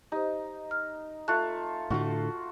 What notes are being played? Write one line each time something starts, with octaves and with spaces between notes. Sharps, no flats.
D#4 G4 C5
F6
A3 F4 F#6
A2 D3 A3 F4 F#4